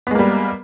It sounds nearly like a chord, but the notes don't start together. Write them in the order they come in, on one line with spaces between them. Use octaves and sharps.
B3 G#3 A#3 G3